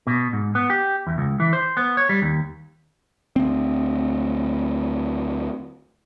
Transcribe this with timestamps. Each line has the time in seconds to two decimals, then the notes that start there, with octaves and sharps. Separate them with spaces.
0.07 B2
0.33 G#2
0.55 B3
0.70 G4
1.07 E2
1.18 C#2
1.40 E3
1.53 C5
1.77 B3
1.97 C#5
2.09 G3
2.22 D#2
3.36 D2 C4